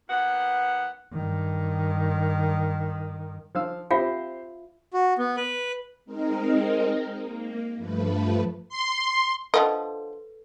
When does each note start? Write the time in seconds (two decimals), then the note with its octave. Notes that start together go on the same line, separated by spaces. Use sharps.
0.09 D#2 B3 F#5
1.13 G2 D#3
3.55 F3 F5 E6
3.91 C4 F4 G4 C5 E5 F5
4.93 F#4
5.18 B3
5.37 B4
6.05 G#3 C4 D#4 A#4
7.23 A#3
7.76 G2 F3 A3 B4
8.69 C6
9.54 D3 F3 A4 B4 D#5